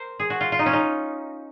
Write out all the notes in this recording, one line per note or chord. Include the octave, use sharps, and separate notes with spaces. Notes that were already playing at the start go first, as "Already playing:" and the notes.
Already playing: A#4 C5
G#4
F#4
F4
F4
D#4
C#4
D#4